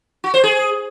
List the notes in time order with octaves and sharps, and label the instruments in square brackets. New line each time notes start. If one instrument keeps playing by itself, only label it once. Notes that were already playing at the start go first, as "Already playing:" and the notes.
[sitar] F#4
C5
G#4